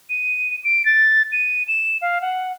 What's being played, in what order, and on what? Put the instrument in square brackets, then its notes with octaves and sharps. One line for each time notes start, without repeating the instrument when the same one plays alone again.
[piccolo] D#7
D7
A6
D#7
E7
F5
F#5